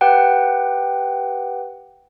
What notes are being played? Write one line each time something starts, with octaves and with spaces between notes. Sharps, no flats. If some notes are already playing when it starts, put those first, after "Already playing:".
G4 B4 F#5 G5